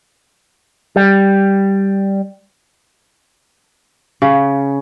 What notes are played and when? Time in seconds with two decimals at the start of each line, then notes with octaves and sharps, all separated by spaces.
0.96 G3
4.22 C#3